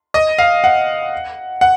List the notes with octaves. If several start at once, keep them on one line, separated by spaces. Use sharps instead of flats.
D#5
F5
F#5
F#5